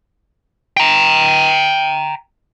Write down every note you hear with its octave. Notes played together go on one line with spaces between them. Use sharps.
G5 A#5